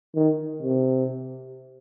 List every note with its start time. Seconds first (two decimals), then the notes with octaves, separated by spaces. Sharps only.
0.15 D#3
0.62 C3